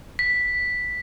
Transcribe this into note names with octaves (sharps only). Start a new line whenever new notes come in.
B6